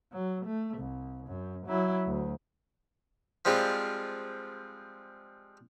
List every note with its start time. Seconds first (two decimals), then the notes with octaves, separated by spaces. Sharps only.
0.12 F#3
0.45 A3
0.78 C2
1.27 F#2
1.67 F#3 E4
2.06 D2
3.45 F3 G3 G#3 C4 F4